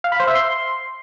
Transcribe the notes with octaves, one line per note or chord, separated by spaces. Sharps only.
F5
B5
C5
E5
C6